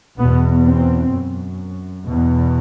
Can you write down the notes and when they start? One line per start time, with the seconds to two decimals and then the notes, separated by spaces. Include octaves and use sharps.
0.18 E2 B2 B3
0.64 C4
1.11 F#2
2.06 E2 B2